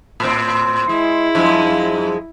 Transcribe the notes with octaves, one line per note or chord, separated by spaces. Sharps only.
A2 C4
G#3 E4
F#2 F3 G#3